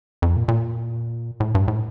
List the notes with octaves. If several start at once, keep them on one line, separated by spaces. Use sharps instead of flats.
F2
A#2
A#2
A2
G2
A2